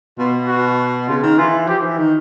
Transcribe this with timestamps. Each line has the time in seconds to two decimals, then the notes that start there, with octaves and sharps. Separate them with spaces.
0.19 B2 F4
0.47 F#4
1.07 C#3 F4
1.23 D#3
1.38 E3 F4
1.68 F3 G4
1.83 E3
1.99 D#3